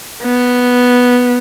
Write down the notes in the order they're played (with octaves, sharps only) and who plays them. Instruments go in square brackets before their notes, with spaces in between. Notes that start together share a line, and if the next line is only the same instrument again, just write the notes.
[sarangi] B3